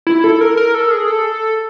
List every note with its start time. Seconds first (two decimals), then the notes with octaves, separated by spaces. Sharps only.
0.07 E4
0.24 A4
0.41 A#4
0.57 A#4
0.75 A4
0.91 G#4
1.08 A4